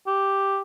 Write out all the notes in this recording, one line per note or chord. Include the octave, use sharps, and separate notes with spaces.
G4